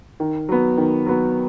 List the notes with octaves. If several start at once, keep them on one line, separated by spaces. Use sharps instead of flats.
D#3
F#3 B3
D#3
F#3 B3